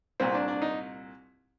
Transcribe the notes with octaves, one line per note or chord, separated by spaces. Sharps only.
C2 A#2 C4
D4
D4
D#4